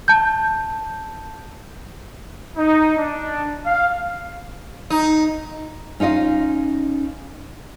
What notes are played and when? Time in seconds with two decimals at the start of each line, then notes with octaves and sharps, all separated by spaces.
0.08 A5 G6
2.56 D#4
2.97 D4
3.65 F5
4.90 D#4
6.00 C#4 D#4 F4 D#5 F5